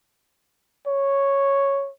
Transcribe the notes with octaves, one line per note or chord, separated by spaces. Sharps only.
C#5